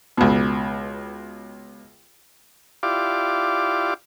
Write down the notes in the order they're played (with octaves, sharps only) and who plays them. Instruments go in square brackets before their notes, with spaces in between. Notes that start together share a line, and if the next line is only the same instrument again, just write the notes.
[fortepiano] C#2 B2
[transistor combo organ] E4 F4 G4 D5 F5 D6